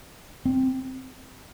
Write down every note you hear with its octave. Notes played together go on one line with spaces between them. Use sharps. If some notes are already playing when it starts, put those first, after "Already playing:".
C4